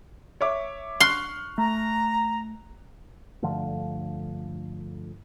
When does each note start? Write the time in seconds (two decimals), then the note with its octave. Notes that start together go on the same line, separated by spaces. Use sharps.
0.41 C#5 E5 D6
1.00 C6 C#6 F6 F#6
1.58 A3 A#5
3.42 G2 D3 F3 A3